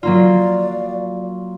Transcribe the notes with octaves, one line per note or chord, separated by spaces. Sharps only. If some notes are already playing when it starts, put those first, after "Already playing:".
F#3 A#3 F4 D5